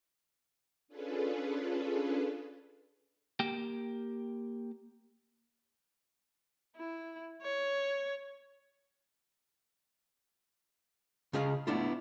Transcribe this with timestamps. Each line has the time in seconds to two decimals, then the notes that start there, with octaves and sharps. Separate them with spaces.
0.88 C#4 D4 F4 G#4 A4 B4
3.40 A#3 G4 G5
6.77 E4
7.42 C#5
11.33 C#3 C#4 G#4 D#5 F5
11.67 A3 B3 D4 E4 F4